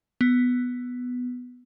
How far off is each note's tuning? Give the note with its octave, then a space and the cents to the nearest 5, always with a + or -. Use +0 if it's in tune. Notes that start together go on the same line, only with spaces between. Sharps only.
B3 +5